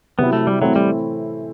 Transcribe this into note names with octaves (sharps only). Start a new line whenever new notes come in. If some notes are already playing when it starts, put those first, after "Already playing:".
C3 F#3 B3 C4 E4
A3
G3
A2 E3 F#3 A3 C4 E4
G3